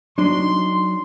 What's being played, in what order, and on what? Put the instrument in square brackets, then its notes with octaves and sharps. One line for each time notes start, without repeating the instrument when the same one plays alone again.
[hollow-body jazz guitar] F#3 D4 D#4 [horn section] C6